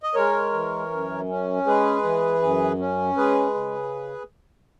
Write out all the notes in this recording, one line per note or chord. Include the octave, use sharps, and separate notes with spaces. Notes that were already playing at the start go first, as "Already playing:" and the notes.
D#5
G#3 A#4 C#5
E3
F#2
C#4
G#3 G#4 B4
E3
F#2
C#4
G#3 G#4 B4
C#3